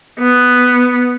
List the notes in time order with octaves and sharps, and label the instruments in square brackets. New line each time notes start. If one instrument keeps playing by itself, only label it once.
[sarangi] B3